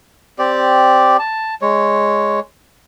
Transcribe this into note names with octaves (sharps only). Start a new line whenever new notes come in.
C4 G4 D5
A5
G#3 C#5